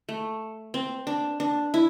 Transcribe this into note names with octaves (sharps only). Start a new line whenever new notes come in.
A3
C4
D4
D4
E4